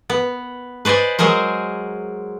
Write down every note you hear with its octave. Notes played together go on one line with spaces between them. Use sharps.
B3
B4 C5 D5 D#5 G#5
F#3 G#3 G#4 A#4 C5